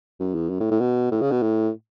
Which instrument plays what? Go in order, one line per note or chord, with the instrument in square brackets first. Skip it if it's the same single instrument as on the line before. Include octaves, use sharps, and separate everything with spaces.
[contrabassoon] F#2
E2
F#2
A2
A2
B2
A2
C#3
B2
A2